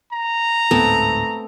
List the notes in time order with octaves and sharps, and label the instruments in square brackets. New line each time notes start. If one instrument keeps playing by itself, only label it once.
[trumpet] A#5
[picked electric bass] D1 G#2 [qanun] A3 B3 C4